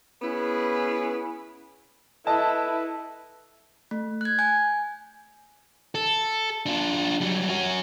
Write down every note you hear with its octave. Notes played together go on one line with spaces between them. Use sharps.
B3 C#4 E4 G#4 B4
E4 A4 B4 D#5 A5
A3
F#6 G#6
G#5 G6
A4
D4 F4
F#3 G3
C#4 F#4